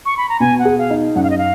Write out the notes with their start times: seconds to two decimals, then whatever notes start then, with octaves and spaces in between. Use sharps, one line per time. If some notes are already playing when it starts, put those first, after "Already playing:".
0.06 C#6
0.17 B5
0.29 A#5
0.40 B2 G#5
0.59 F#5
0.65 G#4
0.78 F5
0.90 D#4
1.16 F#2 F#5
1.23 F5
1.30 D#5
1.38 F5